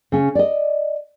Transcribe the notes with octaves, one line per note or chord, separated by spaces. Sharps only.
C#3 C#4
D5 D#5